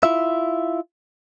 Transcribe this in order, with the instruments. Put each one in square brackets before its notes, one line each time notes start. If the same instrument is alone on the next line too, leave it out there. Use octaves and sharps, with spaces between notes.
[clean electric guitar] E4 F4 E5